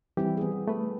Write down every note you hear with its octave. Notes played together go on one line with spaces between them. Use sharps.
E3 G3 C4 E4 G4
B3 G#4
A3 B4